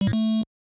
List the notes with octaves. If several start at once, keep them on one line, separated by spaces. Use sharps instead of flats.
G3
A2
A3